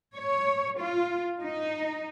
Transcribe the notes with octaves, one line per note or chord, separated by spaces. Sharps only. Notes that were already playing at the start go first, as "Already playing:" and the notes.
C#5
F4
D#4